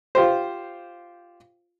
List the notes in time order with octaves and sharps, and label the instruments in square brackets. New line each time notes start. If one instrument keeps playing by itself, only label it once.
[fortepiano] F4 G4 C5